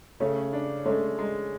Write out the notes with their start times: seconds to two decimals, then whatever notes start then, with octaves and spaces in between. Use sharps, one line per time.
0.20 C#3 A3 C#4
0.53 D4
0.86 G#3 A3 C#4
1.19 G#3